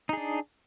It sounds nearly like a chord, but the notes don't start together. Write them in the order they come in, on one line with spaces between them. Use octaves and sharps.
D#4 G#4 D4